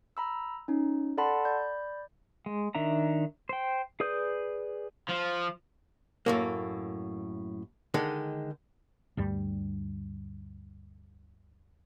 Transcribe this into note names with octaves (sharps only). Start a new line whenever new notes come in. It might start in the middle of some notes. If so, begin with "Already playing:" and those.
A#5 B5 E6
C#4 D#4
A4 D5 F#5 A5 B5 C6
D5 B5 G6
G#3
D#3 D4 E5 A#5
C5 G5
G#4 B4 D5 D#6 G6
F3
F#2 A2 A#3
D3 D#3 G#3
D2 G2 G3